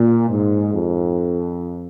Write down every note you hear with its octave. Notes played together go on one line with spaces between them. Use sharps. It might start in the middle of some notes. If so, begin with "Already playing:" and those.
Already playing: A#2
G#2
F2